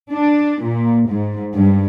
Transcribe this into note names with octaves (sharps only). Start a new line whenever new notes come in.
D4
A#2
G#2
G2